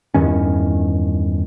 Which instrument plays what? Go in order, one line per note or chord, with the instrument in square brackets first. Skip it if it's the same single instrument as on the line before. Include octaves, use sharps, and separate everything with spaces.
[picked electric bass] E2 G2 D#3 C#4